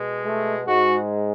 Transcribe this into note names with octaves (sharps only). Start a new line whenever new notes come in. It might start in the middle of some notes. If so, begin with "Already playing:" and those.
Already playing: B2 G#3
A3
G#2 G#3 F#4